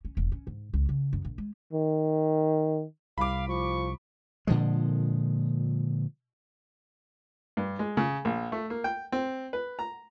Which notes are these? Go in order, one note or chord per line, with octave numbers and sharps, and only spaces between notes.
C#4
E1
C#4
G#2
C#2
C#3
F#2
A#1
G#3
D#3
C2 F5 B5 D6
F3 C#6
A#2 D3 F3 G#3
G2
G#3
C#3
A#1
A3
A#3
G5
C4
B4
A#5